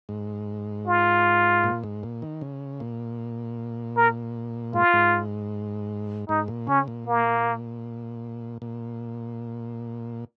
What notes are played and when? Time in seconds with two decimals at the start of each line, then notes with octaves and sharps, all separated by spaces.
0.09 G#2
0.87 F4
1.64 A#2
1.84 G#2
2.03 A#2
2.22 D#3
2.41 C#3
2.80 A#2
3.97 A#4
4.73 G#2 F4
4.93 G#2
6.29 G#2 D#4
6.48 A#2
6.67 C#3 C#4
6.88 A#2
7.07 A#3
8.62 A#2